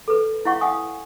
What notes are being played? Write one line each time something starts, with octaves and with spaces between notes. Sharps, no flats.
A4 B4
E4 C#5 F5 F#5 C#6
F5 F#5 G#5 D#6